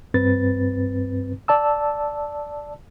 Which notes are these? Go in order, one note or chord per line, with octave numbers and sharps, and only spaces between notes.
G2 C4 B4 A6
D5 A5 E6